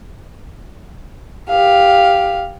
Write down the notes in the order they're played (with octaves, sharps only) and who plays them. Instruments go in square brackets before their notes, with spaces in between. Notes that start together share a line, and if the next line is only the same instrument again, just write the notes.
[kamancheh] G4 F5